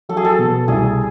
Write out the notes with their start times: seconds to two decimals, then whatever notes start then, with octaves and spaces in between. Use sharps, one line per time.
0.09 F#3 A4
0.17 G#4
0.25 A4
0.39 B2
0.68 C2 G#4